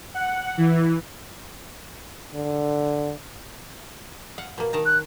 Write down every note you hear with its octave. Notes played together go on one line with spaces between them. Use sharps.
F#5
E3
D3
F5 F#5
B2 A#3
D#3 A5 A#5
F#6